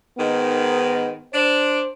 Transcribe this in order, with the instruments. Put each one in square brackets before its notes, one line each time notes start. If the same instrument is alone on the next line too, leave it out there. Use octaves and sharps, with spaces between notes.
[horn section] G#2 D#3 [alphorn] B3
[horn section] D4 [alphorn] C5